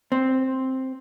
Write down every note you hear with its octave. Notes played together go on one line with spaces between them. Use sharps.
C4